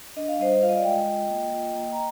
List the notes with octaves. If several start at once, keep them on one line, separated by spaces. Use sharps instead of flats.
D4 D#5
F5
G3 C5 D#5
F4 F5
D#5
D5 F5
G#3 D#5 G5
F4
A#3
F4
A#3
A#5